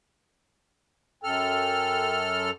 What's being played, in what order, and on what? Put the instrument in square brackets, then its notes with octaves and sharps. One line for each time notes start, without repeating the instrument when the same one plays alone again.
[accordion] F#2 A4 F6 [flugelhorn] G5